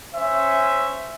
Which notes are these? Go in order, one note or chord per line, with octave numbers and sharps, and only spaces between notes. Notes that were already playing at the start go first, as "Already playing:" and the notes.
C#4 C5 E5 G#5